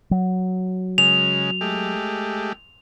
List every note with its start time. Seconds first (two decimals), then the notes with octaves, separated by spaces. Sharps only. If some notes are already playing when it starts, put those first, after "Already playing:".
0.11 F#3
0.98 C#3 G#3 F7
1.61 G#3 A3 G4